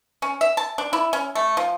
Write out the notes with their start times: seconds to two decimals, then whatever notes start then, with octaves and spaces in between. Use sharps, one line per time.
0.22 C#4
0.41 E5
0.57 A5
0.78 D4
0.93 E4
1.13 C#4
1.35 A3
1.57 F3